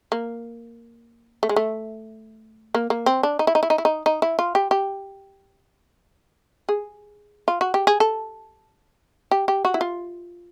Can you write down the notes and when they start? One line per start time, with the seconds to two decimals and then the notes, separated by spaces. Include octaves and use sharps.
0.12 A#3
1.43 A3
1.49 G#3
1.56 A3
2.75 A#3
2.90 A#3
3.06 C4
3.23 D4
3.39 D#4
3.47 E4
3.55 D#4
3.63 E4
3.70 D#4
3.78 E4
3.85 D#4
4.06 D#4
4.22 E4
4.39 F4
4.55 G4
4.71 G4
6.69 G#4
7.48 F4
7.61 F#4
7.74 G4
7.87 G#4
8.00 A4
9.31 G4
9.48 G4
9.65 F#4
9.74 E4
9.81 F4